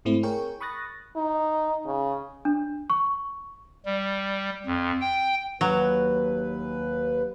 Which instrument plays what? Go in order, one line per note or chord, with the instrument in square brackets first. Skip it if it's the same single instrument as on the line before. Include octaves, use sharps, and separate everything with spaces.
[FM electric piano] G#2 A3 C4 E4
G#4 A#4 C#5 G5 G#5 C#6
B5 C#6 D#6 F#6 A6 A#6
[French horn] D#4
C#3
[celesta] D4
C#6
[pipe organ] G3
F2
G5
[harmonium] D#2 B4 [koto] F#3